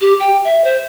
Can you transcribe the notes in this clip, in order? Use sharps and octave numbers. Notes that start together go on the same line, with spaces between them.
G4
G5
E5
C5